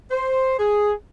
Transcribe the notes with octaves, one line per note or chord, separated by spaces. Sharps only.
C5
G#4